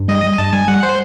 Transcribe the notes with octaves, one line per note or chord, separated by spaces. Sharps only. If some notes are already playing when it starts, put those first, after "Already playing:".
Already playing: G2
G3 D#5
G3
G2 A5
G3 G#5
G3 F#5
C5